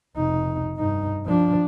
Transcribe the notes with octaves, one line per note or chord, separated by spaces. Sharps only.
F1 D#4
G2 D#4
F3 D4